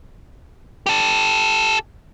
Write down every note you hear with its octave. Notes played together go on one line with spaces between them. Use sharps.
G4 A4